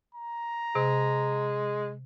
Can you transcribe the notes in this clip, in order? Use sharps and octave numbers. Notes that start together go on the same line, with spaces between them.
A#5
C3 G#3